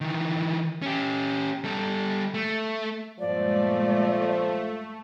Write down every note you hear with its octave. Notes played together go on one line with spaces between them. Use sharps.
D#3 E3
C#4 G4
G3 A4
A3
G2 A#2 F3 G#3 A3 D5